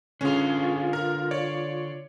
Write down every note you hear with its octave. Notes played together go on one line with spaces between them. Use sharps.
D3 C#4 F4 G#4
A#4
C#5 D5